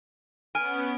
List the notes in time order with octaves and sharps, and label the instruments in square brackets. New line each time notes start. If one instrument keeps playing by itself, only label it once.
[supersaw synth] B3 C#4 [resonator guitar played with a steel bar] G#5 [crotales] F6 D7